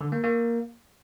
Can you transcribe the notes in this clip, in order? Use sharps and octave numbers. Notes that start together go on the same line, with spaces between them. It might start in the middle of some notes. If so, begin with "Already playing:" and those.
D3
A#3
A#3